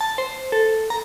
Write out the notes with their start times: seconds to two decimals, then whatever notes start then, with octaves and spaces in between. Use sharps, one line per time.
0.01 A5
0.18 C5
0.52 A4
0.90 A#5